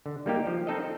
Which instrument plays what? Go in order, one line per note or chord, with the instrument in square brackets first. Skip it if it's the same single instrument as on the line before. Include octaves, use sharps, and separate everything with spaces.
[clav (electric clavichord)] D3
G3 A#3 D#4 G4
F3
C4 D#4 A4 D#5